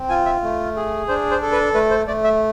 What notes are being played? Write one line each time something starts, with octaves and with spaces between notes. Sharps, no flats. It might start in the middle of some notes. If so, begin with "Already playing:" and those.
Already playing: C4
F4 G#5
E5
A3
G#4
D4 C5
C5
A4
B4
A3 B4
C5
A3 D5
E5